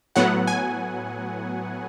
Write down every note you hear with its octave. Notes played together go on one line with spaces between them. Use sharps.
A2 F#3 B3 F#5
G#5